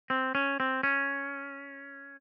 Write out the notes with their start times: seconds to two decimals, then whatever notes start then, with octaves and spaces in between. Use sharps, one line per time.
0.10 C4
0.35 C#4
0.60 C4
0.83 C#4